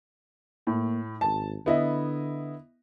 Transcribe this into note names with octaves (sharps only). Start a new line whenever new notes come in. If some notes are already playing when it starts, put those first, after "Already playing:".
A2 A#3
G#1 A5
D3 B3 E4 D#5